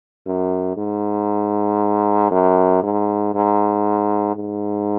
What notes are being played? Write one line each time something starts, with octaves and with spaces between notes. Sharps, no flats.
F#2
G#2
F#2
G#2
G#2
G#2